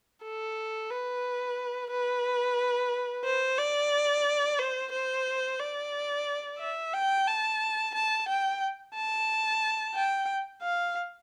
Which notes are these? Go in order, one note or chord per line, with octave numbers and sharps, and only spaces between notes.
A4
B4
B4
C5
D5
C5
C5
D5
E5
G5
A5
A5
G5
A5
G5
F5